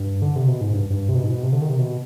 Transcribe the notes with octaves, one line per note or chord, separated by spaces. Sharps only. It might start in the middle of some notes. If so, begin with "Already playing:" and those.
Already playing: G2
D3
C3
B2
G#2
G2
G2
C3
B2
G#2
B2
C3
D3
D#3
C3
B2